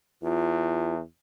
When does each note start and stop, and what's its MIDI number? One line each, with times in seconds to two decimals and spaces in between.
0.22 1.01 40
0.22 0.93 65